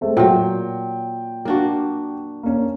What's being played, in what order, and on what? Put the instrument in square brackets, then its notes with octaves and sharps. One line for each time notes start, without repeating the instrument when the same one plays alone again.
[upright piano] G#3 A3 C4
[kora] A#2 F#3 [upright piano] G5
[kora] A#3 D4 F#4
[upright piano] A#3 C#4